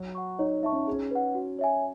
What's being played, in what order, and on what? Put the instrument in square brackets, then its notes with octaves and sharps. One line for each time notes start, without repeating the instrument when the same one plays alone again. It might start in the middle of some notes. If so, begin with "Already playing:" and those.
Already playing: [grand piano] F#3 F#4
[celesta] F#5 C#6
[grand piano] D#4 [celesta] C#5
[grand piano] D#4 [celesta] E5 A5 C#6
[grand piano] C#4
[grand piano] C#4 [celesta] G#4
[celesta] B4 F#5
F#4
C#5 E5 G#5